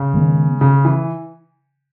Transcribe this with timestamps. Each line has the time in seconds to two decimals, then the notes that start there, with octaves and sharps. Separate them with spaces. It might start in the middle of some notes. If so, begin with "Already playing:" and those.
Already playing: C#3
0.14 D#3 G#3 B3
0.61 C#3
0.85 E3